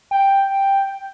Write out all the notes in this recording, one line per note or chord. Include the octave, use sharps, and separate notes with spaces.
G5